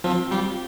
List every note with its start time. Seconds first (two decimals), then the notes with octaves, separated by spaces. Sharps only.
0.04 F3 C4
0.31 G3 F4